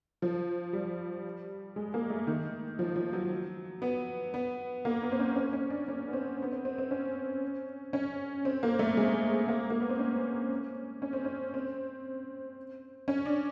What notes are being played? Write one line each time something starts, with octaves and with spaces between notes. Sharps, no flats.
F3
G3
G#3
A#3
A3
D#3
F3
F3
F#3
B3
B3
A#3
B3
C4
C#4
C#4
C#4
D4
C#4
B3
C4
B3
C4
C4
C4
C#4
C#4
C4
A#3
A3
G#3
A#3
A#3
B3
C4
C#4
C#4
C4
C#4
C4
C#4
D4